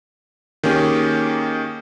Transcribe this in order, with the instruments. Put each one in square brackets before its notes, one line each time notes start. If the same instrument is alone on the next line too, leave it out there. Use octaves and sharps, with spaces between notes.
[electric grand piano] D#3 A#3 C#4 G4 G#4